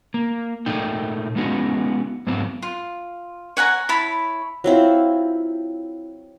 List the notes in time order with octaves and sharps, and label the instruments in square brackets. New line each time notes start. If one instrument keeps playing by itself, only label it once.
[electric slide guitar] A#3
A#2 A3 D#4 G5
G#3 B3 C#4 D#4 F#4
G#2 F#3 B3 C4
[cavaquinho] F4
C#5 F#5 G#5 A#5
E4 C#5 A5 B5
[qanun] F#3 C4 E4 F4